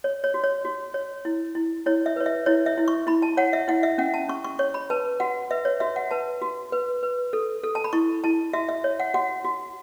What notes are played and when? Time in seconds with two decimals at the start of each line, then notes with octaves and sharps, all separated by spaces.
0.04 C#5
0.24 C#5
0.34 F#4
0.44 C#5
0.65 F#4
0.94 C#5
1.25 E4
1.55 E4
1.86 E4 C#5
2.06 E5
2.16 B4 C#5
2.26 E5
2.46 E4 C#5
2.66 E5
2.78 E4
2.88 C#6
3.07 E4 B5
3.22 A5
3.37 C#5 F#5
3.53 E5
3.68 E4 F#5
3.83 E5
3.98 C#4 F#5
4.14 A5
4.28 C#4 C#6
4.44 C#6
4.59 C#5 C#6
4.74 B5
4.90 B4 A5
5.20 F#4 F#5
5.51 B4 E5
5.65 C#5
5.80 F#4 E5
5.96 F#5
6.11 B4 A5
6.42 F#4
6.72 B4
7.03 B4
7.33 A4
7.63 A4
7.75 A5
7.84 B5
7.93 E4 C#6
8.24 E4 A5
8.53 F#4 E5
8.69 E5
8.84 C#5
9.00 F#5
9.14 F#4 F#5
9.45 F#4